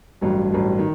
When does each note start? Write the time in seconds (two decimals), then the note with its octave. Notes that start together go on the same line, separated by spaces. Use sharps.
0.21 A1 G2 F#3
0.51 A1 G2 F#3
0.78 D#3